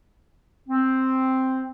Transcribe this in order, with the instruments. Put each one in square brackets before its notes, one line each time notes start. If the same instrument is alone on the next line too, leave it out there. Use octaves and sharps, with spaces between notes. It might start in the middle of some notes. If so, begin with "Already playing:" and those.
[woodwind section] C4